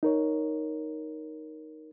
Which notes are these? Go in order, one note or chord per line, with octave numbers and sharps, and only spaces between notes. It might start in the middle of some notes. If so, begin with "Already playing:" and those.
D#4 A#4 C#5